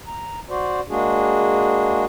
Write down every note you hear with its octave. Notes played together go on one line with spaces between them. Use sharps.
A#5
F#4 C5 D5
G#3 A#3 D4 F#4 G#4